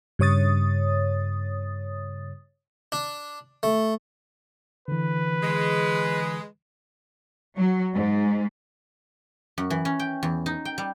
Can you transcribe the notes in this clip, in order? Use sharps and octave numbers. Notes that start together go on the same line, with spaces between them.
G2 C#3 C#5 D#6 A6
D4
A3
D3 E3 B4
G#3
F#3
G#2
F#2
E3
C#4
G5
E2
D#4
G5
G3